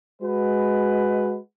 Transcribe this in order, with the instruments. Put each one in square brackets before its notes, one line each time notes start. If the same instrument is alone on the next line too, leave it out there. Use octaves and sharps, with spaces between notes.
[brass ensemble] G#3 F#4 B4